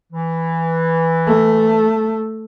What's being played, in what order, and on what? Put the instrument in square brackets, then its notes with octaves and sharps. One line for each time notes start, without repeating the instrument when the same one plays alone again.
[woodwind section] E3
[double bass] A3